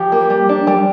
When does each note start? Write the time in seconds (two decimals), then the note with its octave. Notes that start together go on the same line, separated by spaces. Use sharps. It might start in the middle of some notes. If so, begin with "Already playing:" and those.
Already playing: F3 G4
0.12 A#3
0.30 G3
0.49 D4
0.67 G3